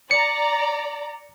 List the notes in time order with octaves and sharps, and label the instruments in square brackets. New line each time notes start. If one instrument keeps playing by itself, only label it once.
[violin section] D5 A#5 [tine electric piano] C#7